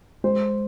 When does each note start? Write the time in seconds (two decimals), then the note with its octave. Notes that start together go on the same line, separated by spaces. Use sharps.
0.24 G#3 C5